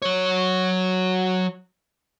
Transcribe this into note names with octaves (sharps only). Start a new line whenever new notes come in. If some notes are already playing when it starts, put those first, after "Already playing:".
F#3 C#5